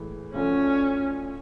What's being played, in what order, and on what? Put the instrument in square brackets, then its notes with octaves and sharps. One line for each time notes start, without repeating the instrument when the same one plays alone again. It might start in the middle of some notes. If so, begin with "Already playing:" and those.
Already playing: [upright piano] A2 E3 G#3
[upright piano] D2 D3 F3 A3 [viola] C#4